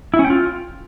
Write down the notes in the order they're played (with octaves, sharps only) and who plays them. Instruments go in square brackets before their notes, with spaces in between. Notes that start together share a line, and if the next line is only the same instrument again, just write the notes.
[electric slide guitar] E4
C#4
G5
F4